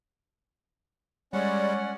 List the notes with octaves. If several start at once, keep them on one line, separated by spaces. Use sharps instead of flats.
G3 G#3 C#4 C#5 D5 F#5